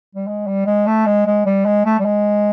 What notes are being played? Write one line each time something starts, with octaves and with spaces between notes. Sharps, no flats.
G3
G#3
G3
G#3
A3
G#3
G#3
G3
G#3
A3
G3
G#3